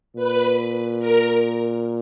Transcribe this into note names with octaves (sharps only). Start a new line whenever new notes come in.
A#2 B4
A#4